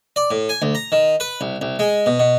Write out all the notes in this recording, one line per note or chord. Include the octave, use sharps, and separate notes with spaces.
D5
A2
G#5
D2
A#5
D#3
B4
C2
C2
G#3
B2
B2